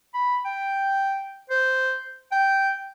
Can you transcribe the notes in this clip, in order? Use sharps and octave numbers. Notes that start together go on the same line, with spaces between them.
B5
G5
C5
G5